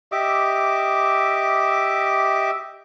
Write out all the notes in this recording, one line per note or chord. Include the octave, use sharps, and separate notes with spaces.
G4 D#5 E5 D6